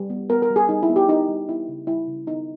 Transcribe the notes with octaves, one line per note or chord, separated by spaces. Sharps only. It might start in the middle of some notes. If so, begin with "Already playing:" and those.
Already playing: G3
B3
B3 A#4
A#4
G3
G#4
G3 D#4
E4
B3
G4
B3 D#4
G3
B3 E4
C#3
G3 E4
C#3
B3 D#4